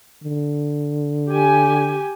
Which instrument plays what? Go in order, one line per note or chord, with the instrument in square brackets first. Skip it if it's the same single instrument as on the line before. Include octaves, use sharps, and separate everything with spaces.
[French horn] D3
[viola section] G4 G#5